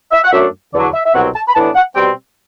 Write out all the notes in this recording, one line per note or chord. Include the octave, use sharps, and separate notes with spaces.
E5
F#5
F#2 F#3 A3 D4 E5
E2 D3 F#3 D5
E5
E5
C2 B2 F#3 C4 F#5
A5
B5
A2 E3 B3 D4 A5
F#5
B2 G3 C4 G5